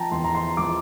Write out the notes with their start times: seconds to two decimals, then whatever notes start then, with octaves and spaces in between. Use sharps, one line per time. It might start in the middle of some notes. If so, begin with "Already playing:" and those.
Already playing: F3 G5 A5 A#5
0.11 E2 C6
0.24 A#5
0.35 C6
0.57 F3 D6